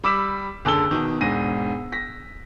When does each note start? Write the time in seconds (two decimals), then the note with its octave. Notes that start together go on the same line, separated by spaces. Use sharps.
0.04 G3 B5 D6 E6 B6 E7
0.65 F#1 D3 A4 E6 G7
0.91 E2 B2 D#3
1.21 E1 G#2 D4 A#6 D#7
1.92 A#6 B6